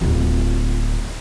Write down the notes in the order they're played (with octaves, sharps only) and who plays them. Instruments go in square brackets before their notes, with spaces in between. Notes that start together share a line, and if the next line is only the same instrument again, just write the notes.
[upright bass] D1 F4